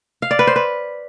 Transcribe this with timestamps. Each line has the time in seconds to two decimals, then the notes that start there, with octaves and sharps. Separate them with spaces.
0.22 F5
0.31 D5
0.39 B4
0.47 C5
0.56 B4